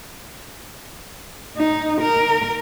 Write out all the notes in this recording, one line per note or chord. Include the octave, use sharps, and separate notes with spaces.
D#4
A#4